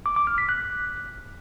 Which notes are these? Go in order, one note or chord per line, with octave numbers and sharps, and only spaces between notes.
D6
D6
F6
B6
F#6